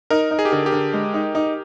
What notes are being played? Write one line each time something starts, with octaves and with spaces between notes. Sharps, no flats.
D#4 A#4
D#4
G#4
G4
D3 G#4
G4
D3
G#3
D#4
D#4